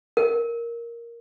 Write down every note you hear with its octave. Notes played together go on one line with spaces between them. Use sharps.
A#4